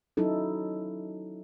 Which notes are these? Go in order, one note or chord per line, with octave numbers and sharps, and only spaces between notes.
F#3 C#4 D#4 E4 A4